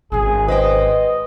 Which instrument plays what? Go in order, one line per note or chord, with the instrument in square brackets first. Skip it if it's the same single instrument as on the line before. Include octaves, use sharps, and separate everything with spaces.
[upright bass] G#1 C#4 [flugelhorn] G#4
[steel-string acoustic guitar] B4 C5 G5 [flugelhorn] D#5